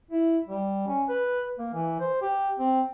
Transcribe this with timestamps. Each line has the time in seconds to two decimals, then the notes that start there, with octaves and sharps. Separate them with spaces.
0.11 E4
0.48 G3
0.87 C#4
1.09 B4
1.59 A#3
1.73 E3
2.00 C5
2.22 G4
2.59 C4